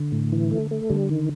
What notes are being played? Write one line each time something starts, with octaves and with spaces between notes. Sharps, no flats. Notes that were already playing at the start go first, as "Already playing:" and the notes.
Already playing: D3
A2
E3
A3
A3
D3 G3
D#3